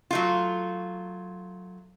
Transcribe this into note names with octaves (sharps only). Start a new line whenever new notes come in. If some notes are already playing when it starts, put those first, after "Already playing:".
F#3 A3 F4